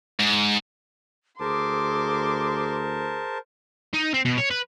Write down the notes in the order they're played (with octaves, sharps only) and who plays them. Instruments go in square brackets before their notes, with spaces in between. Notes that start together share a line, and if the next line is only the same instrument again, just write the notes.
[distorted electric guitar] G#2
[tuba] D2 [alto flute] G#4 [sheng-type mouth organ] A#4 C5 A5 [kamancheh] C6 D6
[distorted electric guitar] D#4
C4
B2
C#5
B4